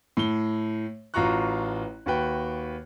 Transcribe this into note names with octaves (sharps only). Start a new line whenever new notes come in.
A2 G7
A1 F4 F#4 A#5 C#6 F#6
D#2 F#4 B4 G5